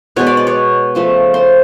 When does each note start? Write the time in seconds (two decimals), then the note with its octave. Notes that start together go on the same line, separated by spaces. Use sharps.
0.16 B2 G#3 B3 C#5
0.27 D5
0.37 D5
0.47 C#5
0.95 C#3 F3 A3
1.34 C5